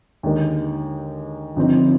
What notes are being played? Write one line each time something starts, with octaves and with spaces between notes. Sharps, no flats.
D#2 D3 G#3 D#4 A#4
G1 G2 F3 C4 D#4